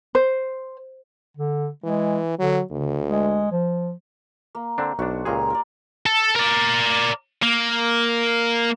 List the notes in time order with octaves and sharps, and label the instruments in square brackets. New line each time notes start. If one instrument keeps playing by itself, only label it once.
[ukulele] C5
[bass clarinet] D3
[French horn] E3 [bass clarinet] G#3
[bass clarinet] D3 [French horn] F#3
[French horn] D2 [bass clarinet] C#3
[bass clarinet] G#3
F3
[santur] A#3
[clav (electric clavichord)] D3 C4 D4
[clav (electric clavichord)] B1 D4 [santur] F#4 C5
[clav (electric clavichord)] C#2 A#2 G#4 [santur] G4 A#5 C6
[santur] A#4 D5
[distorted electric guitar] A4
A#4 D5
A#3